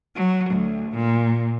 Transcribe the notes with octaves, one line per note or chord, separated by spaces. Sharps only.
F#3
D2
A#2